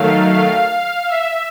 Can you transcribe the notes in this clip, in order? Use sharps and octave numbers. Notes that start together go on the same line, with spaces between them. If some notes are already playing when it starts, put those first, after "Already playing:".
Already playing: D#3 F#3 A3 F5
F5
F5
E5